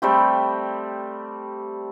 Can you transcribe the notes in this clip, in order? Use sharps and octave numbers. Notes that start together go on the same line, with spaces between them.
G3 A3 C4 G4